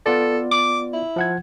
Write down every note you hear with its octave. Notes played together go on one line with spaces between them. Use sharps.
B3 F4 A4 D5
D6
E4
F3 F#5 G#6